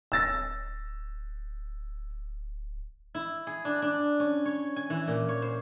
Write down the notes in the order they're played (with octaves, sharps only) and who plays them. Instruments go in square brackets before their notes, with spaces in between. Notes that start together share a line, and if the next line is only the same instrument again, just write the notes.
[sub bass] D1 [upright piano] E6 A6 A#6
[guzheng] E4
G#4
D4
D4
C#4
C#5
G#5
E3
A#2
C#5
C5